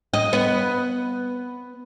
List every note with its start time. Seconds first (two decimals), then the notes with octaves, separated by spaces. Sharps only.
0.14 D#5
0.33 B3